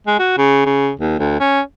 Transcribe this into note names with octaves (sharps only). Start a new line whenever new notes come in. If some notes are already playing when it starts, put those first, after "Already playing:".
G#3
F#4
C#3
C#3
D#2
D2
C#4